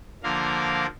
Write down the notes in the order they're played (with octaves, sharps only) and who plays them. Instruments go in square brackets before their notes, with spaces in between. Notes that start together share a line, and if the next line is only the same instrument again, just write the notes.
[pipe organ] D3 F3 A#3 A#4 F5